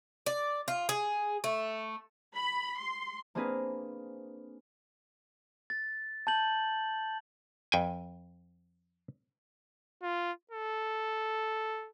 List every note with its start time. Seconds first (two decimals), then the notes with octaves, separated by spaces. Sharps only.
0.26 D5
0.68 F4
0.89 G#4
1.44 A3
2.36 B5
2.79 C6
3.35 A#3 C4 D4 G#4 A#4 B4
5.70 A6
6.27 A5 G6 F#7
7.72 F2 G5 G#5
10.03 F4
10.51 A4